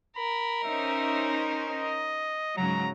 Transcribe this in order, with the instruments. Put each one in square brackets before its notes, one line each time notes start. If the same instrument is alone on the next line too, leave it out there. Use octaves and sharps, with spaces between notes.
[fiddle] A#4 [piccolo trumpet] B5
[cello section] C#4 D#4 C5 [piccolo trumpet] E5
[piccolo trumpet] D#5
[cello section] G#2 C#3 F#3 [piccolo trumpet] A#5